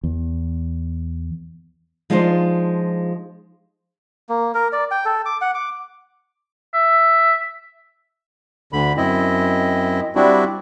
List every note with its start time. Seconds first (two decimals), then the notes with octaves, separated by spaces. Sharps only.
0.04 E2
2.10 F3 G#3 D4 D#4 F4 C5
4.29 A#3
4.54 A#4
4.73 D5
4.91 G5
5.06 A4
5.26 D6
5.41 F#5
5.55 D6
6.74 E5
8.73 D2 D3 B5
8.97 F#2 C4 E4 D#5
10.15 G3 C4 D4 E4 F#4